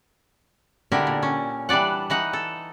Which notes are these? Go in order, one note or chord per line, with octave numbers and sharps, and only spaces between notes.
B2 D3 D4 E4 G4 A#4
A#2
C#4
E3 G3 D4 D5 F#5
E3 D#4 F#5
A4